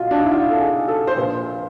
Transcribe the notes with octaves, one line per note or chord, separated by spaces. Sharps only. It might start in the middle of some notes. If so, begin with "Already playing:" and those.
Already playing: B1 A#2 F4 F#4
D4
D#4
E4
F4
A4
G#4
A4
C5
A#1 A#2 F3 B4